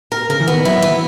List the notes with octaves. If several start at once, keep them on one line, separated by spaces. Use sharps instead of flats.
A#4
C#3 A#4
E3
D#3 B3
F#3 E4
B3
E3